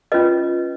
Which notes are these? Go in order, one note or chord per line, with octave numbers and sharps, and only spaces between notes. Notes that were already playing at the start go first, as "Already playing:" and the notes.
C#4 F4 B4 D#5